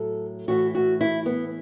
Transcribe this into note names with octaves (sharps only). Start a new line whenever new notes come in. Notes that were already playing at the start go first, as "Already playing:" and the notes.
Already playing: A2 F#3 A4
A2 E3 A3 F#4
F#4
E4
B3